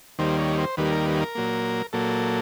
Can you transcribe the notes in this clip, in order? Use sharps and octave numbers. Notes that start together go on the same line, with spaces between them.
D#2 D#3 G3 A#3 C5
C#5
C5
D#2 D#3 G3 A#3 B4
A#4
B4
A#4
A#2 F#3 A#3
A#2 F#3 A#3 A4